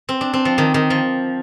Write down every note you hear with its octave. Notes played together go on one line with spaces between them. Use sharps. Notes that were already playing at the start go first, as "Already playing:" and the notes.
C4
D4
C4
F3
D#3
D#3
F3